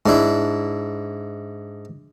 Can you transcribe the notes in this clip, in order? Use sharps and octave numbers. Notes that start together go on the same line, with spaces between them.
G#2 D4 E4